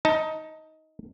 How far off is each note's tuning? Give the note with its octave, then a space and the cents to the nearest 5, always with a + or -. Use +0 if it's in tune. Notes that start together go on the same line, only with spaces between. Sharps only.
D#4 +15 D#5 +20 A5 +30